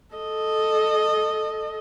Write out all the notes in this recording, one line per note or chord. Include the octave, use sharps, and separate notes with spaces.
A4 D#5